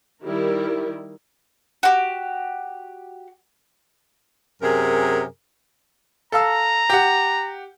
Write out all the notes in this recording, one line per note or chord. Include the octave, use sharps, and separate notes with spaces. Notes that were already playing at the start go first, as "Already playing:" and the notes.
D#3 G3 E4 G4 A#4
F#4 G4
F#2 C3 G#4 A#4
A4 F5 A#5 E6
G4 F#5